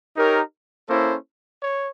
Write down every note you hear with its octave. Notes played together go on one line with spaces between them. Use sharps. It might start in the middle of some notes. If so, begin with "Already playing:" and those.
D#4 G4 A#4 C#5
A#3 C#4 E4 A4 C5
C#5